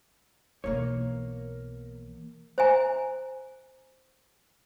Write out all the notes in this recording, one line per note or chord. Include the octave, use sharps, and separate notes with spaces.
B1 E3 A#3 C#5
C5 E5 G#5 A#5